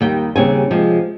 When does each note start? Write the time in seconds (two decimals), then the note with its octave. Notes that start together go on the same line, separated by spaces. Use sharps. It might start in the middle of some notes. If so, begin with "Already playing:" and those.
0.01 D#2 D#3 G3 G5
0.36 D#2 C#3 G3 C4 G#5
0.71 C3 F3 G#3 C4